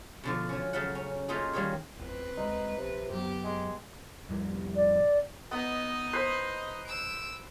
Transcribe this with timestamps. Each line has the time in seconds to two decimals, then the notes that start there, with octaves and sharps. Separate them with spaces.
0.24 B2 D3 F3
0.49 F3 C#4
0.73 C#3 F#3 A3 A#4 F#5
0.95 C#4
1.28 A3 A#3 C#4 D#4 F4 G#4
1.53 D#3 G3 A#3 G#4 C#5
1.99 G1 E2 C4 B4
2.37 D#1 D2 G#3 D#4
2.78 A#1 C3
3.10 F#2 F#3 B3 G4
3.44 G#3
4.29 F2 A2 G3
4.76 D5
5.51 B3 D#4 D#5
6.13 B4 C5
6.86 E6 D7